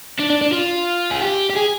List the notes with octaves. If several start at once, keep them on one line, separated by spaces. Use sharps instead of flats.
D4
D4
D4
F4
G#4
G4
G4
G#4